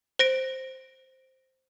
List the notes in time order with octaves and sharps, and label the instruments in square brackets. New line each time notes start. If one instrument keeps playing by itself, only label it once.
[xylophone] C5 A#6 D7